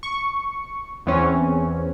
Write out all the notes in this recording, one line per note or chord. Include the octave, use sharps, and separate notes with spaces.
C#6
E2 E3 C4 C#4